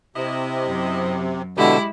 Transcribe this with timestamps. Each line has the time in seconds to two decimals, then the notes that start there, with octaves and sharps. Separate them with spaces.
0.16 C3 E4 D#5
0.64 F#2
1.58 B2 D3 G#3 E4 G4